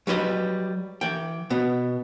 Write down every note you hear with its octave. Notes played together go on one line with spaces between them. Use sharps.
F#3 G3 B4 D#5
E3 G5
B2 B3